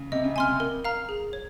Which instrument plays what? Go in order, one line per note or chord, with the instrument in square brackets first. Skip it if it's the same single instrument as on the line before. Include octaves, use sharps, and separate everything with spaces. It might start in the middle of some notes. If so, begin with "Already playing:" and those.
Already playing: [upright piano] C#3
[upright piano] C3 [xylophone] D#5
[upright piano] C#3
[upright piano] C3 [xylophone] G#5 C6 F6
[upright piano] C3
[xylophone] A#4
F5 A#5 F6
G#4
C#5